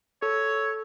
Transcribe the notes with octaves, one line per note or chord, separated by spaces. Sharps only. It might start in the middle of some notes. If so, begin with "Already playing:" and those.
A4 C#5